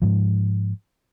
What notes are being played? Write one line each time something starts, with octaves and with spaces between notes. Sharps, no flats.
G#2 F3